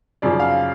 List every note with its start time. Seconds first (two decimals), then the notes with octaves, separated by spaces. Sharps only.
0.22 F#2 C#3 F3 D5
0.40 F5